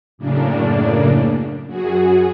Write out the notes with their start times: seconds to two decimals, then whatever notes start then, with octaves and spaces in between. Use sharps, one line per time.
0.18 F#2 A2 C#3 A#3 D4
1.66 F#2 F#4 G#4